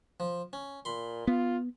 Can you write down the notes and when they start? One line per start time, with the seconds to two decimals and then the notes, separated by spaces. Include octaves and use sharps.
0.20 F3
0.53 C#4
0.85 A#2 B5 C6
1.27 B3 F4